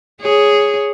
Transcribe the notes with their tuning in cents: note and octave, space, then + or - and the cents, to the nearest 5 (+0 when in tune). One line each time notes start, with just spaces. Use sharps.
G#4 +0 C#5 +0